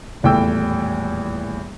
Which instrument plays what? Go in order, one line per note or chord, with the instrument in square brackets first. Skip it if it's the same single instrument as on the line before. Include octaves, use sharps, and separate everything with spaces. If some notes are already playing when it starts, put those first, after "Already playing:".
[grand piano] D#1 E2 A2 G5 E6